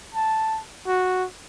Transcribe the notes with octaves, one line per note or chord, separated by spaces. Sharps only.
A5
F#4